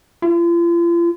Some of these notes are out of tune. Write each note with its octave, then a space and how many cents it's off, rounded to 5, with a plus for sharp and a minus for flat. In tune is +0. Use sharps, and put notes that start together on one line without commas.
F4 -40